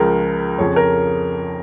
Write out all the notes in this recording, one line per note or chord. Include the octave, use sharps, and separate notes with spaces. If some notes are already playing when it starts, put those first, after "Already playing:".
Already playing: C#2 C#3 F3 A#4
F2 C#3 F3 C#5
A#4